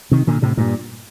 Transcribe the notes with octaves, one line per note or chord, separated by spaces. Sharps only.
C3 D#3
A#2 D3
A2 C3
G2 A#2